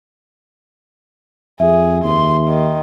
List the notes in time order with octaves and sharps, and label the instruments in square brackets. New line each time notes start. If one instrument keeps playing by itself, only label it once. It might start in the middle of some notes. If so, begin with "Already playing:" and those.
[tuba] F2 [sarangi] G#4 [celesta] E5
[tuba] D#2 [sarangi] C6
[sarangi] D#3